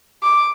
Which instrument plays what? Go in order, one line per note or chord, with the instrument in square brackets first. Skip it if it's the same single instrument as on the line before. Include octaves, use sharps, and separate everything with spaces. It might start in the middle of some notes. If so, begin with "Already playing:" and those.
[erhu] D6